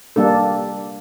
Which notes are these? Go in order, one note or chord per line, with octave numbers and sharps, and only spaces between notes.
G3 A#3 D4 A4